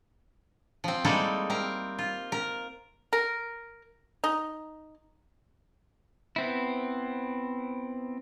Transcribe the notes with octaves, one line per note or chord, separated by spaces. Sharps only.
F3 C4
G3 G#3 A#3 D#4 E4 A4
C4 A#4
F4
A#4
A#4
D#4
B3 C4 E4